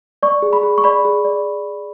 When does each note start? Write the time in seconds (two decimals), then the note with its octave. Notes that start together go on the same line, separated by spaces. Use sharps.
0.23 D5 C#6
0.42 G#4
0.53 B5
0.63 G#4
0.78 C#6
0.84 D5 B5
1.05 G#4
1.25 D5